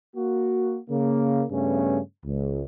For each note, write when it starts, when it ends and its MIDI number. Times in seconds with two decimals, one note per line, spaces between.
0.15 0.78 58
0.15 0.78 66
0.90 1.44 49
0.90 1.44 58
1.50 1.99 43
1.50 1.99 49
1.50 1.99 57
1.50 1.99 59
1.50 1.99 61
2.24 2.63 37